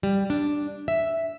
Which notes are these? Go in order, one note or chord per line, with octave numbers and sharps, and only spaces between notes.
G3
D4
E5